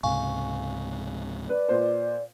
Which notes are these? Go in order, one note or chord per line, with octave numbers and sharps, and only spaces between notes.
C#2 G#2 C3 F5 G#5 C#6
B4 D5
A#2 B4 C5